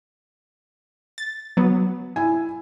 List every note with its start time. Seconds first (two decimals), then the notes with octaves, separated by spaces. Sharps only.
1.18 A6
1.57 F#3 B3
2.16 E4 G#5